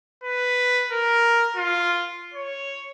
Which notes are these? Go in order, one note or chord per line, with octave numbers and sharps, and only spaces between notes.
B4
A#4
F4
C#5